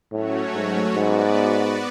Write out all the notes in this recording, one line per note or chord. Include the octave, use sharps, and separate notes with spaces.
A2 F#3 A3 C#4 F#4 C#5
G#2
G#2 B3 F#4 B4 D5